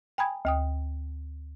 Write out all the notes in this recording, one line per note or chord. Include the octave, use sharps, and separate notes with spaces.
G5 G#5 A#5 B5 D#6 G#6
D2 G5 D#6